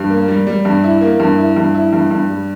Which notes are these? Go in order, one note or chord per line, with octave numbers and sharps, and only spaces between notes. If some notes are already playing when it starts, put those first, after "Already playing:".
Already playing: G2
A#3
G3
G3
G2
E4
A#3
G2
E4
G2
E4
G2
G2
G3